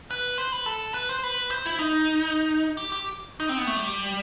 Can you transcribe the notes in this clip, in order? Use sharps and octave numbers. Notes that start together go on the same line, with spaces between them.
B4
C5
B4
A4
B4
C5
B4
C5
E4
D#4
G4
G4
D#4
C4
B3
A3
G3